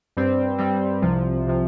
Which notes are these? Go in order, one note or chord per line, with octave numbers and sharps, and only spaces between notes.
G2 G3 C4
G2 G3 C4
C2 C3 F3
C3 F3